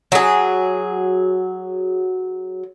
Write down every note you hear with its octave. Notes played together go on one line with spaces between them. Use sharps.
F#3 G#4